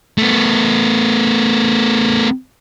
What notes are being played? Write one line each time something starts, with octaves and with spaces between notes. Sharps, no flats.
A3 B3